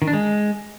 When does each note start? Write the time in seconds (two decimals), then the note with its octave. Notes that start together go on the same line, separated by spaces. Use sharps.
0.02 D#3
0.08 D4
0.13 G#3